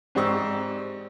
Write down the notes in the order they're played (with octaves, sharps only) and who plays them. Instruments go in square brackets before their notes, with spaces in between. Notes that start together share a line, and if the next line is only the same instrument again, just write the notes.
[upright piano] G#2 C4 G4 D5 C#6 E6